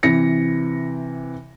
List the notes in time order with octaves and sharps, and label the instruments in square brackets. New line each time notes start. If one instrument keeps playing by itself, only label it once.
[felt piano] C3 E3 A#6 C#7